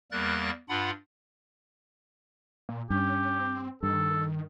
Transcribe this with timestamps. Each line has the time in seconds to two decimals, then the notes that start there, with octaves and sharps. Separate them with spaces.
0.12 E2 G3 A#3 A#4 F#6 A6
0.69 G2 D4 F4 F#5 B5
2.69 A#2
2.90 G2 C#4 G4
3.39 C4
3.83 G2 D#3 A4